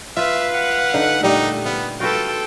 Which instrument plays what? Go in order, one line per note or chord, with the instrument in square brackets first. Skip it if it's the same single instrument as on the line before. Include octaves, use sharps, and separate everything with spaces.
[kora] F4 [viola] B4 F5 [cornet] E5
[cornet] F#5
[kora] D3 D#4
[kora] A#2 G3 [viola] A3 [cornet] D#4
[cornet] B3 [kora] F5
[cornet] F4 [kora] F#4 B4 [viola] A4 G5